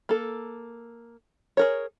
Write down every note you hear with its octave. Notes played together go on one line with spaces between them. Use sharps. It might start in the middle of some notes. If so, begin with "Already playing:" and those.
A#3 A4
G#4 A#4 C#5